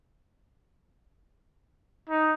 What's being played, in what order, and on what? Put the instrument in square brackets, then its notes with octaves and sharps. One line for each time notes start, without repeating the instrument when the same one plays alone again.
[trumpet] D#4